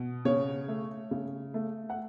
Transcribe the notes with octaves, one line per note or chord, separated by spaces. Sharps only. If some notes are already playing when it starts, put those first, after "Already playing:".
Already playing: B2
C#3 C#5
A3
C#3
A3
F#5